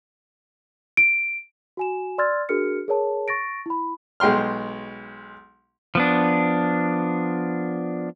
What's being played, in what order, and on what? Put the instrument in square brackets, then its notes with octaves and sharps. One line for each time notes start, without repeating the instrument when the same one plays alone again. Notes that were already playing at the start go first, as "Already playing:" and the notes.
[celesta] D7
F#4 G#5 E7
D5 C6 E6 F6 G#6 A6
D4 F#4 G#4 A#4 F6 C#7
G#4 A#4 C#5 A5
C#6 A6 A#6 D7
E4 B5
[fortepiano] B1 G#3 G5 C6 F6
[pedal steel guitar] F3 B3 D4